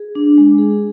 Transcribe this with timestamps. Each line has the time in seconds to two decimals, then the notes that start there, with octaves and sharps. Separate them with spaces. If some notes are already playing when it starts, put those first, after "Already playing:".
Already playing: G#4
0.15 D4
0.38 G#3
0.58 G#4